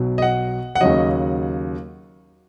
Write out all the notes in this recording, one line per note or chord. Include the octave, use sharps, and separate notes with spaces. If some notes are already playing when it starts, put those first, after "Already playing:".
Already playing: B1 B2 F#3
D#5
F#5
F#5
D#2 C#3 F#3 D#5